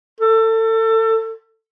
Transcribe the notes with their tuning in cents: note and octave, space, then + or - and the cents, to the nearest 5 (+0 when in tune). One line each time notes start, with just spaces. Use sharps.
A4 +30